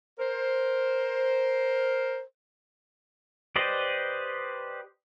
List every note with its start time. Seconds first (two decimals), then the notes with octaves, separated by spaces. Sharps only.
0.19 A#4 C5
3.56 G4 B4 C5 D5 D#5